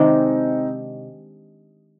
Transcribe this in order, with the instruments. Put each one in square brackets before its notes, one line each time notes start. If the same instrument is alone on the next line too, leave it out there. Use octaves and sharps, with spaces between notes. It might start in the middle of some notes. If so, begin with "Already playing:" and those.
Already playing: [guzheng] C3 D#3 G#3 D4 [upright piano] C4 D#4